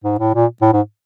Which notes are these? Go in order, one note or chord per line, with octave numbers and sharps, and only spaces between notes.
G#2
A2
A#2
A2
G#2